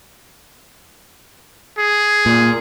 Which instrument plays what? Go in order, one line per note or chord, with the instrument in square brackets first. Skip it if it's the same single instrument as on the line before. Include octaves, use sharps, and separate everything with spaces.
[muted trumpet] G#4
[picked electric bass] A#2